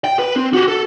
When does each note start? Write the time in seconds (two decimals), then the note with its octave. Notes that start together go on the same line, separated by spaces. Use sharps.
0.04 G5
0.19 B4
0.36 C4
0.53 F#4 G4
0.68 A4